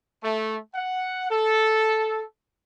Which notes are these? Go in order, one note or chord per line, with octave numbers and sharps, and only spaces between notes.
A3
F#5
A4